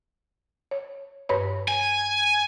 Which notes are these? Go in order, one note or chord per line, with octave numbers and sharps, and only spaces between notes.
C#5
G2 B4 C#5
G#5